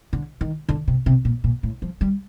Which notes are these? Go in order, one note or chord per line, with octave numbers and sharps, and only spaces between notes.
D3
D#3
D3
C3
C3
A#2
A#2
A2
F3
G3